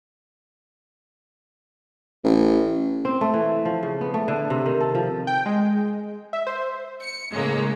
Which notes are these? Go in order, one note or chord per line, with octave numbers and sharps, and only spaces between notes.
A1
C4
A3
E3
F3
C#3
B3
A3
D3
C3
D#3
A4
F3
G5
G#3
E5
C5
C#7
A2 C#3 G#3 A#3